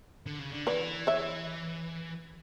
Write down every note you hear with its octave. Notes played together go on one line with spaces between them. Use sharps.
D3
C#3
D3
E3 B4 D5
C#5 E5